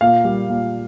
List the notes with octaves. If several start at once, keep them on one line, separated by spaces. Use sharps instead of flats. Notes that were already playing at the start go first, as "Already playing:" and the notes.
A#2 F5
G3
A#2